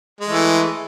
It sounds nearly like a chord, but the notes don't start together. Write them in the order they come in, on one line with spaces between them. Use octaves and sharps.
G#3 A3 E3